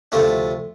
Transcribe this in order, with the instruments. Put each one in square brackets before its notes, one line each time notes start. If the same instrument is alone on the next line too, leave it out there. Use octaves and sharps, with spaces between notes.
[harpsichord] D2 C3 F3 A3 D4